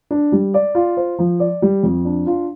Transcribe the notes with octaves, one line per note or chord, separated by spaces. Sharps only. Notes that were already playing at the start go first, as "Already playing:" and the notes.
D4
G3
D5
F4
C5
F3
D5
G3
F2
D4
F4